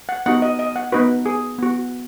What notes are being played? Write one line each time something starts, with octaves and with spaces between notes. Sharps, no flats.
F#5
B3 D#4 F#4 F#5
D#5
D#5
F#5
B3 D#4 F#4 B4
G#4
B3 F#4